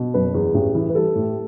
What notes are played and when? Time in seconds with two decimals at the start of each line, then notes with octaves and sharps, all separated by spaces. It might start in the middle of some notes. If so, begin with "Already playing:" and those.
Already playing: B2
0.14 F#1 B4
0.34 E2
0.54 A1
0.75 E3
0.89 B4
0.95 G3 A4
1.15 A2